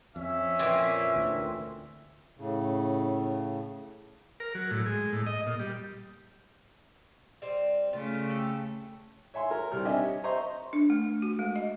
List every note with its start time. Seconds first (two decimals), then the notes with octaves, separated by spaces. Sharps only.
0.16 F2 C#4 E5
0.59 A#2 E3 C4
1.16 D2
2.37 A2 C#3
4.40 A#4
4.55 F#3
4.71 A2
4.86 G#3
5.13 A2
5.26 D#5
5.46 A#2
5.59 G3
7.42 G3 C4
7.93 C#3 A3 F4
8.29 G4 A4
9.34 C#5 E5 G#5 C6
9.51 A#4
9.71 C2 G3 F6
9.85 C4 D4 G4 D#5 E5 G#5
10.03 C#5
10.24 C5 D#5 E5 A#5 C6 C#6
10.73 D4
10.90 A3
11.22 F#4
11.39 G#3
11.56 D#5